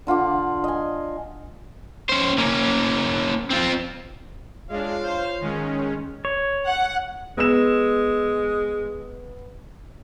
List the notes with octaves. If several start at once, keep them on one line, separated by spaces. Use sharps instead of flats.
D3 F4 F#5 D6
D#5 G#5
C#4 C5
A#3 C#4
C4 F4
G#3 D4 F4 C#5 F5
C5
D#3 G#3 C#4
C#5
F#5
G#3 B3 E6 E7